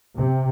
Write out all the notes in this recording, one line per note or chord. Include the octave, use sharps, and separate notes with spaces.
C3